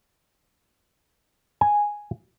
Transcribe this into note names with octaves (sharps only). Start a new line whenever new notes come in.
G#5